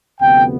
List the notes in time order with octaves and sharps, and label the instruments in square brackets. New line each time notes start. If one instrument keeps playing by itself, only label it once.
[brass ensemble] D2 C3 F3 B3 G5